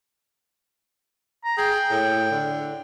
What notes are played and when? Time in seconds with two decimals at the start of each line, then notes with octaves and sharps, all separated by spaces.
1.44 A#5
1.58 G#4 G5
1.91 A2
2.31 D3